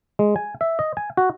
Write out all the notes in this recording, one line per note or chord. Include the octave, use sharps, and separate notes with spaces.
G#3
G#5
E5
D#5
G#5
F#4